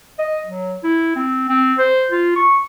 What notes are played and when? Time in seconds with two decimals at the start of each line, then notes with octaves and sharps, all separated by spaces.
0.19 D#5
0.46 F#3
0.83 E4
1.16 C4
1.49 C4
1.78 C5
2.11 F4
2.36 C#6